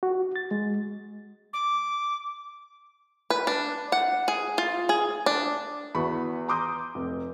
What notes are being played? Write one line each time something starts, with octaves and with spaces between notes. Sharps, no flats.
F#4
A6
G#3
D6
B4
D4
F#5
G#4
F4
G#4
D4
E2 F#4 B5 C#6
A#5 C6 D6 D#6 G6
F1